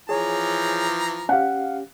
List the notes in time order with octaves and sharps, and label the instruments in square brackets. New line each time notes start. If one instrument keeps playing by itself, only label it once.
[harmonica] E3 F3 A#5 [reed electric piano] G#4 C#5 G#5
[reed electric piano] C#4 G4 [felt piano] F5 F#5